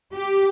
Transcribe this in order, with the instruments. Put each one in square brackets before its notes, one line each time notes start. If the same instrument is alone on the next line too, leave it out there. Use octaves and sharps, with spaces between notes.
[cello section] G4